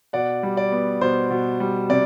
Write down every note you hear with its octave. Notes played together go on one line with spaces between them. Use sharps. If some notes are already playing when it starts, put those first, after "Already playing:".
B2 D5 F#5
G3
D5
B3
B2 C5
B2
G3
C3 D5